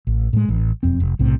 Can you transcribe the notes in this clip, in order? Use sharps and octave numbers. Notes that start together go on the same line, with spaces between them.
A1
A2 G#3
A1
E1 F2 C4
F1
B1 A2 C3